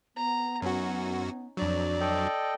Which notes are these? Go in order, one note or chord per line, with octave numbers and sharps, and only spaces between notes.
B3 A#5
F#2 C#4 D#4 F#4
F2 F#3 D4 D5
A4 D#5 G5